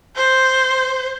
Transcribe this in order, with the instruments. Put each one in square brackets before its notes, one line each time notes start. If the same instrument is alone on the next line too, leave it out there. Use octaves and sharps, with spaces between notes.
[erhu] C5